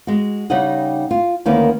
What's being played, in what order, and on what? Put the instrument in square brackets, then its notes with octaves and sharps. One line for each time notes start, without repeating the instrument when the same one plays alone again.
[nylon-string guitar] G#3 F#4
C#3 G3 D#4 G4 D#5 F#5
F4
D2 D#3 A#3 B3 C#4